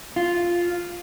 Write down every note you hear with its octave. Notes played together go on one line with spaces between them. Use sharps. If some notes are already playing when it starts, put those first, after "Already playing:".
F4